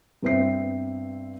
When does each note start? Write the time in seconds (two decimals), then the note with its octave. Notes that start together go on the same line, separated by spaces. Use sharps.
0.22 G2 B3 C4 E5 C7